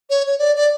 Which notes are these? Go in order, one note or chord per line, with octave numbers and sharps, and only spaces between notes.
C#5
C#5
D5
D5